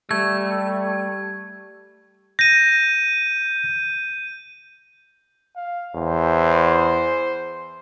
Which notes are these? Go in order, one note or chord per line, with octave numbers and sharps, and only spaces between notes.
G3 A3 G#6
G6 A#6 D#7
F5
E2 C5